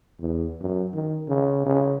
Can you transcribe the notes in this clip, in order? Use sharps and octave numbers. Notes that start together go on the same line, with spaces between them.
E2
F#2
D#3
C#3
C#3